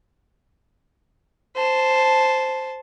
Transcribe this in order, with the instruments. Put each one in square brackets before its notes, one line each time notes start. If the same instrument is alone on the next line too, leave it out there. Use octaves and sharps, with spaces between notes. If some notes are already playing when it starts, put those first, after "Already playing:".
[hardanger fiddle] C5 A5